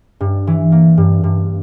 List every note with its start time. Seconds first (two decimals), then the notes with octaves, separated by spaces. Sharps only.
0.20 G2
0.47 E3
0.72 A#3
0.98 G2
1.24 G2